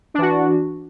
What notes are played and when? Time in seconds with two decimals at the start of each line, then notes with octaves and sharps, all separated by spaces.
0.14 D4
0.18 E3
0.22 F#4